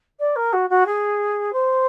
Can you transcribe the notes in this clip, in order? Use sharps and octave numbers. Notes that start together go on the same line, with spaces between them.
D5
A#4
F#4
F#4
G#4
C5